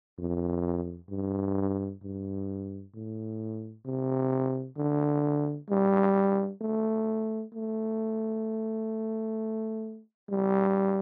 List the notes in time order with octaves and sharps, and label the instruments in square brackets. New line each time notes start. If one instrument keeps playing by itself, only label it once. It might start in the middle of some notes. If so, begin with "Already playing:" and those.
[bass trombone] F2
G2
G2
A2
C3
D3
G3
A3
A3
G3